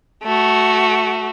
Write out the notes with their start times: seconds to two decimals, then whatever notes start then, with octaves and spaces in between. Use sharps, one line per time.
0.24 A3 F#4